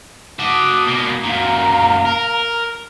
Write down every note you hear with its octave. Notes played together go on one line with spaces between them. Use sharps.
F#4 A5 D6 D#6
B2 A#3
F#2 A#2 F5 A#5
A#4